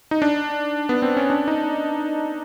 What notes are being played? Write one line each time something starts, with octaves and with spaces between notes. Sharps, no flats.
D#4
D4
B3
C4
C#4
D4
D#4